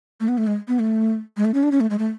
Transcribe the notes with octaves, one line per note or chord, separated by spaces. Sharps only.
A3
B3
A3
G#3
B3
A3
G#3
A3
C#4
D4
C#4
A3
G#3
A3